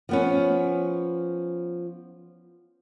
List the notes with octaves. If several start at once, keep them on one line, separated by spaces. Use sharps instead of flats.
F3 B3 C#4